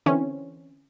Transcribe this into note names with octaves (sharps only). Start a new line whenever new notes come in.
D3 E3 C4 C#4